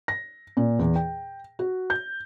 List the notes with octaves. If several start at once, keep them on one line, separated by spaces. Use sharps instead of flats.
A#6
A#2
E2
G5
F#4
G6